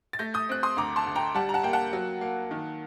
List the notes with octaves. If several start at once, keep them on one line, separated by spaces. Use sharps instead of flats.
A6
A3 G6 A#6
D#6 G6
C4 F#6
C6 D#6
D2 A#5 D6
A5 C6
D2
G5 A#5
G3 F#5 A5
A#5
F#5 A5
A#3 G5
F#5 A5
F#3
A#3
D#3